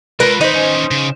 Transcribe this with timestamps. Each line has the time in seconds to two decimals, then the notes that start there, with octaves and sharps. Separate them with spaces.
0.20 G#3 F4 A#4 B4
0.41 D#3 D#4 C5 B5
0.54 D#2 C#4
0.91 C#3